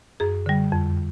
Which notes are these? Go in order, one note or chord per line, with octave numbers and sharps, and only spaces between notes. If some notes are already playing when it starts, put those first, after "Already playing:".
F#2 G#4
D3 G3
F2